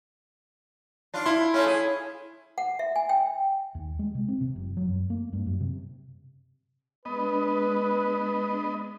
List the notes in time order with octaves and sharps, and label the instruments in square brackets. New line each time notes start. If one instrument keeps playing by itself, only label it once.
[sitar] D4 F4
[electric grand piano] E4 C6
[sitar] A3 C#4 F4
G#4
[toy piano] F#5
E5
G#5
G5
[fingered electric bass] D#2
G#3
C3
C4
C3
F#1
F#3
F#2
A#3
G2
F#2
C3
[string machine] G#3 D4 [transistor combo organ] B3 D#5 [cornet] B4